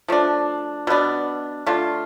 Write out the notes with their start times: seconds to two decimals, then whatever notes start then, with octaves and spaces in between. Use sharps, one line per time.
0.08 F3 A3 D4
0.87 B2 B3 D4
1.66 D3 A3 D4 F4